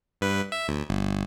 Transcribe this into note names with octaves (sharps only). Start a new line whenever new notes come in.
G2 B4
E5
D2
G1